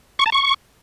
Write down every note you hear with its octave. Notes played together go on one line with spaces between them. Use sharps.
C#6
A5
C#6